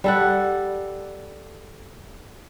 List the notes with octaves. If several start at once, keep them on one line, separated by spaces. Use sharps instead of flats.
G3 A4 F#5